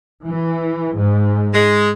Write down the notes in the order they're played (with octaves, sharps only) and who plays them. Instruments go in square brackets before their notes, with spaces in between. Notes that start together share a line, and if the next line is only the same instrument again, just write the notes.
[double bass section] E3
G#2
[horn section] G#3